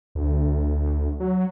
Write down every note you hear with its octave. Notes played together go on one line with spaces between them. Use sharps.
D2
F#3